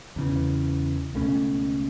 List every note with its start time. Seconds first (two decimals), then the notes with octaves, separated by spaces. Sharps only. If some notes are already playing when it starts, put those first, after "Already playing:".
0.16 E2 C#3 E3
1.15 C#2 B2 A3 C#4